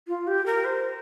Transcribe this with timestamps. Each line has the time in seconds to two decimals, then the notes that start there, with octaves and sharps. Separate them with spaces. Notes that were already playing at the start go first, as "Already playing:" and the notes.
0.08 F4
0.27 G4
0.46 A#4
0.65 C5